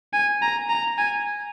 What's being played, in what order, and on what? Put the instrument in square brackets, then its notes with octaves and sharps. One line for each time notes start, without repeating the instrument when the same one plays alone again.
[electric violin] G#5
A#5
A#5
G#5